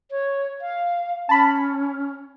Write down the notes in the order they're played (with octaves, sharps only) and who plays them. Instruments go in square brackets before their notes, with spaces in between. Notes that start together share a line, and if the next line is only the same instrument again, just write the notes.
[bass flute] C#5
F5
[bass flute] C#4 [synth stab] A5 B5